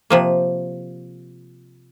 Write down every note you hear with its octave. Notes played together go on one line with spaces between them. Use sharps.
C3 F3 A#3